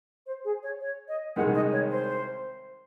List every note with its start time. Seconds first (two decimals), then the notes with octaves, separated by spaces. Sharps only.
0.26 C5
0.44 G#4
0.63 C#5
0.81 C#5
1.08 D#5
1.36 C2 C3 D#3 G#3 F#5
1.55 D#5
1.72 C#5
1.90 C5